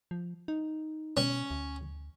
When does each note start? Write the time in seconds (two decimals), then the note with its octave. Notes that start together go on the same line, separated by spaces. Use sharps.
0.11 F3
0.48 D#4
1.17 B2 C#4
1.51 D2